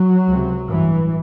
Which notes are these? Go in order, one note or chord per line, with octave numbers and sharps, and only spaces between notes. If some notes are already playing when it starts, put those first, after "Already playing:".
Already playing: F#3
C#2 C3
A1 G2 E3